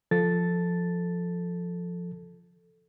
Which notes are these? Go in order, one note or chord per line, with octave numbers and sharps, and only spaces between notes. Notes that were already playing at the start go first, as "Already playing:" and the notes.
F3 A4 A6